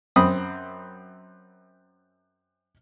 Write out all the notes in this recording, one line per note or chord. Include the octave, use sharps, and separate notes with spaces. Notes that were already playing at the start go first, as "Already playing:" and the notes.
F#2 C4 B5 D#6